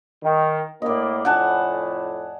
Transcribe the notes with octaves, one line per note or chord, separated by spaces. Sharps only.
D#3
A2 A#3 D5 D#5
F2 A2 F#5 G#5 A5